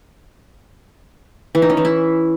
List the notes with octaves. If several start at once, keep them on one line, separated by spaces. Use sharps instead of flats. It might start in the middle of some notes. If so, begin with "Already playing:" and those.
E3
D#4
C#4
E3
E4